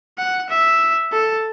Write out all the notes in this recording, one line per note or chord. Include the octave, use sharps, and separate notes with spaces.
F#5
E5
A4